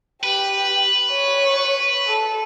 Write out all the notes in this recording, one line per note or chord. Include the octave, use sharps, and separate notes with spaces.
G4 B4
C#5
A4